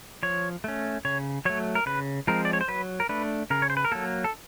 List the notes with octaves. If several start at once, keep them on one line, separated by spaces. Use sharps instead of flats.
F3 C#5
A3 C#4
C#3 C#5
F#3 A3 C#5
A#4
C#3 B4
F3 G#3 C4 A#4
D5
C#5
C5
F#3 B4
A#4
A3 D4 B4
C#3 A#4
C#5
C5
B4
A#4
F#3 A#3 A4
A4